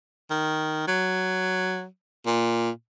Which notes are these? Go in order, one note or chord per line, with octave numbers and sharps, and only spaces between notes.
D#3
F#3
A#2